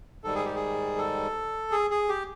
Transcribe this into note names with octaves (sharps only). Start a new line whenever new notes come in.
G#2 D#3 G3 A4
G#4
G4
G#4
A4
G#4
G#4
G4